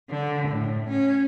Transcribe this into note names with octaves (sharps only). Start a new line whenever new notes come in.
D3
A2
C#4